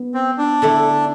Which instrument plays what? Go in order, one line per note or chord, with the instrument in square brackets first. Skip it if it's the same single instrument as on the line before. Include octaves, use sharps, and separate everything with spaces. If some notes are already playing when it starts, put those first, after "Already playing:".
Already playing: [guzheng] B3
[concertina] C4
D4
[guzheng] D3 A3 E4